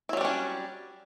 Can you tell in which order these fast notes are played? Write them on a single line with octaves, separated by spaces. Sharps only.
E4 F#3 G3 D4 C#4